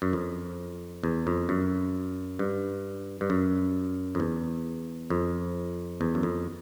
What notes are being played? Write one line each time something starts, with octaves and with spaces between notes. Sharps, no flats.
F#2
F2
E2
F2
F#2
G2
G2
F#2
F2
E2
F2
E2
F#2
F2